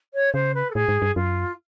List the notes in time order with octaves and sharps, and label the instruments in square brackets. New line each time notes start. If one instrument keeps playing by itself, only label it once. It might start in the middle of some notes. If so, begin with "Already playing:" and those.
[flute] C#5
[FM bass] C#3 [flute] C5
[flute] B4
A4
[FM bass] A2 [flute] G#4
[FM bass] G#2
G2
[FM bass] F#2 [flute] F4